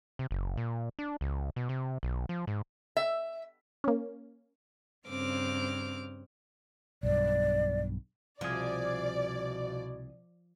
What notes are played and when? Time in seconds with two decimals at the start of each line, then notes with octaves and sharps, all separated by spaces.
0.19 C3
0.31 F#1
0.57 A#2
0.99 D4
1.21 C#2
1.56 B2
1.69 C3
2.03 B1
2.29 F3
2.47 G#2
2.97 E5
3.84 A#3 C#4
5.08 G2 C#3 C4 D6 F6
7.03 B1 G2 D5
8.41 C2 B2 F3 G#4 D5